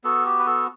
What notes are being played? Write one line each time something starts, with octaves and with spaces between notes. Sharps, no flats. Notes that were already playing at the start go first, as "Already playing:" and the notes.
B3 F#4 A4
G4
B4
A4